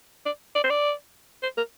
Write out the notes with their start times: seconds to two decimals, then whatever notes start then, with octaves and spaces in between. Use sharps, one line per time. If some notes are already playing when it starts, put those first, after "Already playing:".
0.26 D5
0.55 D5
0.63 C5
0.70 D5
1.43 C5
1.57 A#4